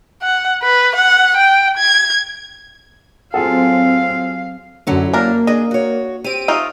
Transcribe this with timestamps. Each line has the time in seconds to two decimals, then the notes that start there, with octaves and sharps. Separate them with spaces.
0.23 F#5
0.63 B4
0.96 F#5
1.37 G5
1.78 G#6
3.34 F#3 C4 F4 G#4 A4 F5
4.87 F#2 D3 F#3 C#4 E4
5.13 A#3 D4 A#4
5.47 D4 G#4 D#5
5.71 F#4 C#5
6.24 C4 G4 D7 D#7
6.48 A3 D#4 F4